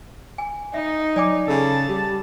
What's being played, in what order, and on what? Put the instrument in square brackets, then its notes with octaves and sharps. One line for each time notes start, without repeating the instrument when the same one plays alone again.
[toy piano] G#5
[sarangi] D#4 [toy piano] E5
[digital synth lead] F#3 [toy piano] D5 G#5 D6
[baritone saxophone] C#3 [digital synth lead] A4 [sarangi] A5
[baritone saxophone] G3 [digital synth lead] G4